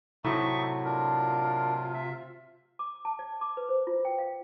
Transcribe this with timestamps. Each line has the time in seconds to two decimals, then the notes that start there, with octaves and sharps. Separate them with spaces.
0.25 A2 C3 F#3 D#4 E5 C#6
0.85 D4 F4 A#4
1.94 E5
2.79 D6
3.05 A5
3.19 D5
3.41 D6
3.57 B4
3.69 C5
3.87 F4
4.05 G5
4.19 F5